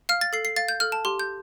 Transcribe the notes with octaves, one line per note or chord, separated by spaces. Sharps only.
F5 F6
A6
A4 C7
C7
F5 A6
G6
A4 F6
A5
G4 C6
G6